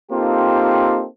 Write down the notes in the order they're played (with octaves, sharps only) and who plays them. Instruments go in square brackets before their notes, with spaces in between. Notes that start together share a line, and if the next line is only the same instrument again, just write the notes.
[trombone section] A#3 C4 D#4 F4 G4 A4